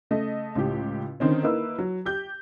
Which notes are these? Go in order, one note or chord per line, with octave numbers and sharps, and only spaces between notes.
C#3 A3 D#5
C#2 A2 G4
D3 D#3 C4 C#4
A#3 D#4 E4 B4 E6
F#3
G4 G6